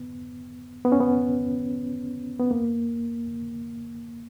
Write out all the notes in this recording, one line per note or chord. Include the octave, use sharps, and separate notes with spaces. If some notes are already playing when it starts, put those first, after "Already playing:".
Already playing: B3
B3
C#4
B3
B3
A#3